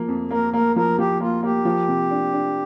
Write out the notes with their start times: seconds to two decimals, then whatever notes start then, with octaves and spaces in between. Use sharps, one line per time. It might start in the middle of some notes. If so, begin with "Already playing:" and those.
Already playing: F3 A#3
0.08 F2
0.31 A#3 A#4
0.53 A#3 A#4
0.76 F3 A#4
0.98 F3 G4
1.20 A#3 F4
1.43 A#3 G4
1.65 F3
1.88 C3
2.10 D4
2.33 D4